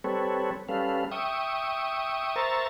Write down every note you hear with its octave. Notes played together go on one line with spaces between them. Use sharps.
G3 C4 A4 B4 C#5
G3 C#4 A4 B4 F5
E5 G5 C#6 D#6
A#4 C5 E5 A#5 C#6 A6